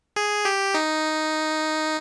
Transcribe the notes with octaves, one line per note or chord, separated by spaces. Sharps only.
G#4
G4
D#4